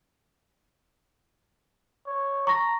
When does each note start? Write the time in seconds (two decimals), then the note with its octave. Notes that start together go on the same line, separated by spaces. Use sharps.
2.06 C#5
2.47 A#5 C#6 A#6